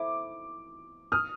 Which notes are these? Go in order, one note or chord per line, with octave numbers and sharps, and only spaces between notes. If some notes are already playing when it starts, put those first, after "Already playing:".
Already playing: E4 A4 C5 E5 D6
D#6 F6